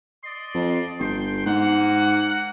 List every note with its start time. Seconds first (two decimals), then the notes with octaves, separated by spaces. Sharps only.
0.24 D5 D#5 C6
0.55 F2
0.99 G1 G5 C6
1.46 G#2 A#3 F#5